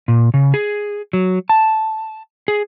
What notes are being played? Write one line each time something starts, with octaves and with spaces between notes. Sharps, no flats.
A#2
C#3
G#4
F#3
A5
G#4